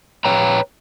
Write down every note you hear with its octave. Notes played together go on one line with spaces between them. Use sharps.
B4 C#5 G5 A#5